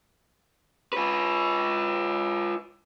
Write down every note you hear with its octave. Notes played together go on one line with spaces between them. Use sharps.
F4 B4